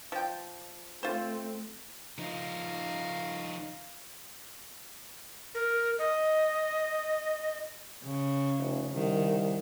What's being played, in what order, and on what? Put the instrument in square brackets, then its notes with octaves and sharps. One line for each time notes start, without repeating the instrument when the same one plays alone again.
[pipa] F3 G5
[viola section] A3 C4 [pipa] F4 C5
[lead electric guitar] F3 D#4 [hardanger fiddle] F5 A#5
[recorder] A#4
D#5
[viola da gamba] C#3
[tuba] F1
[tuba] C2 [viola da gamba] D#3